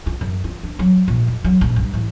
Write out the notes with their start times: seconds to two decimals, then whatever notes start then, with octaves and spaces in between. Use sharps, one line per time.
0.06 F4
0.21 F#2
0.44 F4
0.63 D4
0.79 F#3
1.08 A#1
1.28 F2
1.44 F#3
1.61 A#1
1.76 G2
1.94 A1